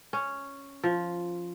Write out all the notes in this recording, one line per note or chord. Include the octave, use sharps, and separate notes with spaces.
C#4
F3